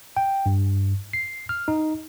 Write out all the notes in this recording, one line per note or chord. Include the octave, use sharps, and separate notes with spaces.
G5
G2
C7
F6
D#4